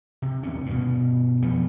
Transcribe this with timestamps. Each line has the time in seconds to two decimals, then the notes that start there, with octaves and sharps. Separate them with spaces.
0.22 C3
0.43 D#2 C3 C#4
0.66 G2 B2
1.42 F2 F3 A3 B3